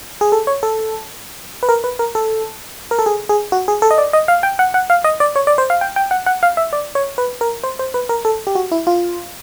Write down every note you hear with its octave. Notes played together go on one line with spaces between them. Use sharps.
G#4
A4
C#5
A4
B4
A#4
B4
A#4
A4
A#4
A4
G#4
G#4
F#4
G#4
A4
D#5
D5
D#5
F5
G5
F#5
F#5
F5
D#5
D5
C#5
D5
C5
F5
G5
G5
F#5
F#5
F5
E5
D5
C#5
B4
A#4
C5
C5
B4
A#4
A4
G4
F#4
E4
F4